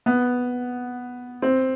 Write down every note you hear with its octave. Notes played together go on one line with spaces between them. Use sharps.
B3
C4